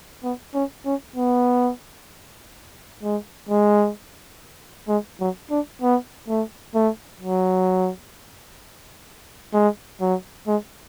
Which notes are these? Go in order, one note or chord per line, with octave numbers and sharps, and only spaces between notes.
B3
C#4
C#4
B3
G#3
G#3
G#3
F#3
D4
B3
A3
A3
F#3
G#3
F#3
G#3